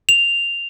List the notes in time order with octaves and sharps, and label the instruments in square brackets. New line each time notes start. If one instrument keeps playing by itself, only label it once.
[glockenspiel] F7